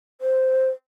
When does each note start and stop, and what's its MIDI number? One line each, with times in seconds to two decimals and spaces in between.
0.21 0.68 72